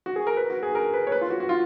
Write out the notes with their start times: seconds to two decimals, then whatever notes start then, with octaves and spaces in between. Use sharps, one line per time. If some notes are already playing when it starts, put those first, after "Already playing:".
0.06 F#4
0.16 G#4
0.27 A#4
0.37 B4
0.50 F#4
0.63 G#4
0.75 A#4
0.94 B4
1.07 C#5
1.12 B4
1.21 F4
1.30 F#4
1.40 F#4
1.49 F4